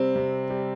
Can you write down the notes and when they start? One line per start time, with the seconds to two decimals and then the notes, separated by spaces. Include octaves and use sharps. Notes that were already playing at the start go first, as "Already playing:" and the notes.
Already playing: C3 G3 C4
0.16 C3
0.50 G3